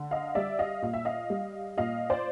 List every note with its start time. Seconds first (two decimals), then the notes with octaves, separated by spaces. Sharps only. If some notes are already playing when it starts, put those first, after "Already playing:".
Already playing: D3
0.11 D#5 F5
0.35 G3 D5 E5
0.59 D#5 F5
0.82 A#2 F5
0.93 E5
1.05 D#5 F5
1.30 G3
1.78 A#2 D#5 F5
2.10 C5 D5